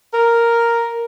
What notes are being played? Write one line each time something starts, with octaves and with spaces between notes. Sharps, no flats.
A#4